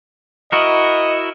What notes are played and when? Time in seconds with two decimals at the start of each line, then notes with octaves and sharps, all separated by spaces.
0.52 E4 F#4 A#4 D#5